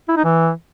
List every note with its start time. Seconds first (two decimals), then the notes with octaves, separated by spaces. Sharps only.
0.08 E4
0.16 D#4
0.24 E3